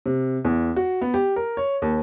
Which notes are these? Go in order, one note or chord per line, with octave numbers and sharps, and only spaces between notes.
C3
E2
F#4
B3
G4
A#4
C#5
D#2